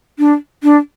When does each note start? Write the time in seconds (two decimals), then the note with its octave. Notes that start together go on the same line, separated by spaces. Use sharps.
0.19 D4
0.63 D4